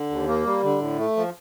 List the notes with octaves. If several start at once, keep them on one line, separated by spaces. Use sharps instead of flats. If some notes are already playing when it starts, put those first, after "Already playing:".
Already playing: D3
D#2
A#3
G3
D3
A2
A3
F3